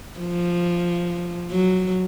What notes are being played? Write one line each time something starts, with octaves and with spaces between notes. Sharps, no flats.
F3
F#3